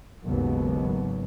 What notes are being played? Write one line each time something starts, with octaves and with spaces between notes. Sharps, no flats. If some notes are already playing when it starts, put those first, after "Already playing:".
G#1 D#2 G#2 C#3 F#3 B3